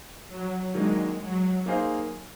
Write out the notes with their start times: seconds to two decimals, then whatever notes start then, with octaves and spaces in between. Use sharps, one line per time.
0.28 F#3
0.74 D#3 F#3 G#3 A#3 D4
1.20 F#3
1.66 A#3 D#4 G#4 C5 F5